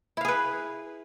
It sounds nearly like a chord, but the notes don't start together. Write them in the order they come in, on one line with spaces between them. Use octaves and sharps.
E4 F5 G#4 B4